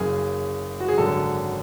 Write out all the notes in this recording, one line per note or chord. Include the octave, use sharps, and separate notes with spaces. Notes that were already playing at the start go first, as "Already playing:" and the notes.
Already playing: F#1 F#2 C#3 G#4
F#4
G#4
G#1 F#2 D3 F#3 A4